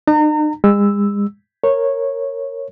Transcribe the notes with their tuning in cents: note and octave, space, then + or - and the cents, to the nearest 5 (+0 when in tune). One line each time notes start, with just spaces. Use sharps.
D#4 -45 A#5 -35
G#3 -40 E6 +0
A#4 -5 C#5 -10